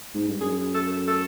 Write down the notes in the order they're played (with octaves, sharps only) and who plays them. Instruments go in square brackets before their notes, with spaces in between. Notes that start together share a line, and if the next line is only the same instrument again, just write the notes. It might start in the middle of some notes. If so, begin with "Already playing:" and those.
[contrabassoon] G#2
G2
[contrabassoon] F#2 [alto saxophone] G#4
[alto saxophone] G#4
A4
A4
A4